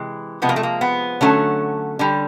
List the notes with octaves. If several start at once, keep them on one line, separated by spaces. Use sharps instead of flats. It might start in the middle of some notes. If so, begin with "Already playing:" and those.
Already playing: C3 E3 G#3
C3 F3 G#3 B3
A#3
A3
A#3
B3
D3 F#3 A3 C#4
D3 G3